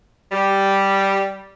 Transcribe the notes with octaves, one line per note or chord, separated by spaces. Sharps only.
G3